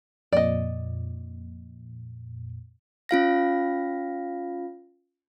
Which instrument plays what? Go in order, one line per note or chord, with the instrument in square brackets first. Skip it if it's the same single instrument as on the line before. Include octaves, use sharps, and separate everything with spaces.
[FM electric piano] F2 A#2 [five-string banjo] D5 D#5
[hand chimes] C#4 F4 F5 A#6